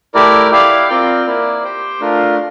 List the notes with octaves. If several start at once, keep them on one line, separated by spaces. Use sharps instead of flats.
A3 E4 G4 A#4 D5
E4 G4 D5 F5
C4 F4 A#4 D5 G5
A#3 E4 A#4 D5
G4 C5 G5
A3 D4 F4 A#4